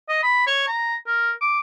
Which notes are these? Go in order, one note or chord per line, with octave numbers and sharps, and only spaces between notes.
D#5
B5
C#5
A#5
A#4
D6